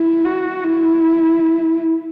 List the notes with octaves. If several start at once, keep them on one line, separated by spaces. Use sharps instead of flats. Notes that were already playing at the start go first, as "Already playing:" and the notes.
Already playing: E4
F#4
E4